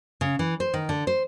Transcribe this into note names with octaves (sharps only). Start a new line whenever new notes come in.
C#3
E3
C5
D#3
D3
C5